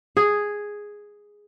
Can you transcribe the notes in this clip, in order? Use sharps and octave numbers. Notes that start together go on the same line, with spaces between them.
G#4